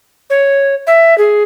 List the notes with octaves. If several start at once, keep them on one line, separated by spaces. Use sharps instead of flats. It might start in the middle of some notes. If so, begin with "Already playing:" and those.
C#5
E5
G#4